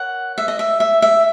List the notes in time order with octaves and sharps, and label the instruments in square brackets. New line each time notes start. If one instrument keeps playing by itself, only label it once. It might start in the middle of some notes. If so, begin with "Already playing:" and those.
Already playing: [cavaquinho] A#4 C#5 F#5
E5
D#5
E5
E5
E5